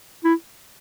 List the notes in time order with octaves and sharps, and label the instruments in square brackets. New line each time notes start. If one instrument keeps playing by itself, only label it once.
[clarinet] E4